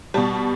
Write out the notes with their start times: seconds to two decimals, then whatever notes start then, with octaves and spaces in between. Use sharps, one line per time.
0.14 B2 G3 A5